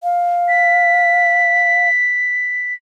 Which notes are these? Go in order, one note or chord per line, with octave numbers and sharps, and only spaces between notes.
F5
B6